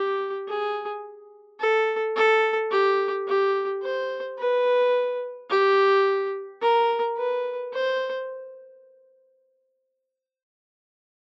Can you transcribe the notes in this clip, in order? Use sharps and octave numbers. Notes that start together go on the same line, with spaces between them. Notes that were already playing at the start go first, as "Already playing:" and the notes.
Already playing: G4
G#4
A4
A4
G4
G4
C5
B4
G4
A#4
B4
C5